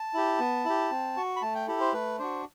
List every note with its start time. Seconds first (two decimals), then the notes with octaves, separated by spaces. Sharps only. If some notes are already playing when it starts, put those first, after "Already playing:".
Already playing: A5
0.14 E4 G4
0.39 B3
0.65 E4 G4
0.91 C4
1.17 F#4
1.36 B5
1.42 A3 A5
1.55 G5
1.68 E4 G4 A4
1.80 C5
1.93 A3 B4
2.19 D4 F#4 C5